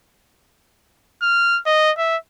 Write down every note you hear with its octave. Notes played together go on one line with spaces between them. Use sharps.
F6
D#5
E5